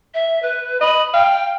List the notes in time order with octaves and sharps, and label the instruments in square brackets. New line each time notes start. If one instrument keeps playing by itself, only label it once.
[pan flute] E5
B4
[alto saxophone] D#5 [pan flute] B5
[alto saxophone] F5 [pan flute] G5